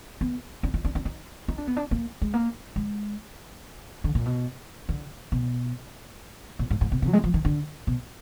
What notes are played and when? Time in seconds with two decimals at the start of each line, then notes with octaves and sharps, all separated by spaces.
0.21 B3
0.63 D4
0.74 D#4
0.85 D4
0.95 D4
1.05 D#4
1.48 D#4
1.58 D4
1.67 B3
1.77 D4
1.91 A#3
2.22 G#3
2.34 A#3
2.76 G#3
4.04 D3
4.15 A#2
4.26 B2
4.89 D3
5.32 B2
6.59 A#2
6.70 G#2
6.81 G#2
6.92 B2
7.02 B2
7.07 F#3
7.13 G#3
7.24 F3
7.34 D#3
7.45 D3
7.87 B2